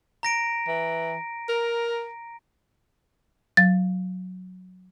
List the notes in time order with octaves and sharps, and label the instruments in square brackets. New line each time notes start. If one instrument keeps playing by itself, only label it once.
[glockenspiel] A#5 A#6 D7
[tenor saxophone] E3
A#4
[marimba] F#3 A6